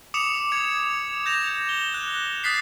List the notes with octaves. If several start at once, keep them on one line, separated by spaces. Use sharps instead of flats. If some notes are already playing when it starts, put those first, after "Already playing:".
D6 D#6 C#7 E7 F7
G#6 C#7
G6 A#6 E7 F7
G7
F#6
D#6 F#6 A6 B6 C7